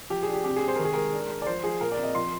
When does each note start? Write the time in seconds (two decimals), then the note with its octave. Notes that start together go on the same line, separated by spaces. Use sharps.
0.10 F3 G4
0.23 G#4
0.28 D4
0.33 G4
0.44 C3 G4
0.56 G#4
0.62 C3
0.68 C5
0.76 D#3 A#4
0.85 G#4
0.94 G#3 A#4
1.13 D4
1.30 D4
1.42 D5
1.46 F3 C5
1.64 F3 G#4
1.81 A#2 A#4
1.92 D5
1.97 C4
2.04 D#5
2.15 F3 C6